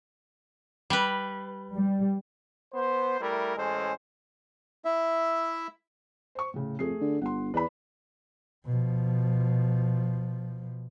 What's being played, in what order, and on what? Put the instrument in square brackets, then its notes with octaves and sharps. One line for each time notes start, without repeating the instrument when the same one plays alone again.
[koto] G3 B4
[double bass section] G3
[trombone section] B3 C5
G3 A3 E4 A#4
A1 G#3 C#4 A4 C5
[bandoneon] E4 E5
[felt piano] C5 C#6
A2 C#3
[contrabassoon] F2 [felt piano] A3 G#4 C7
[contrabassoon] D3
[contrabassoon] G1 [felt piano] F#5 C6
[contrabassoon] E2 [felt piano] B4 D5 B5
[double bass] B2 F3